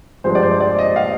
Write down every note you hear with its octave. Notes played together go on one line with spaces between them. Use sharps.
G2 F3 G#3 C5
D5
C5
D5
D#5
F5